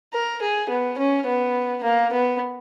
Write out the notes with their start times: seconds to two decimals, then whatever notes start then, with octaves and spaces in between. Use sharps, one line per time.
0.13 A#4
0.42 G#4
0.69 B3
0.98 C#4
1.26 B3
1.83 A#3
2.13 B3